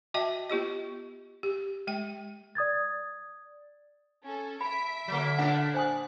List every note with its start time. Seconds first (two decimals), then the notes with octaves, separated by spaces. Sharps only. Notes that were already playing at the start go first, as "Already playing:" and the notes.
0.14 F#4 D#5 E5 G5 A5
0.50 B3 F4 G4 D#5
1.43 G4
1.87 G#3 G5
2.55 D5 D#6 G#6 A6
4.24 C#4 A4
4.61 E5 B5 B6 D7
5.08 D3 F#3 A#3
5.38 A#2 D4 F#5
5.74 C5 G#5 D#6 F#6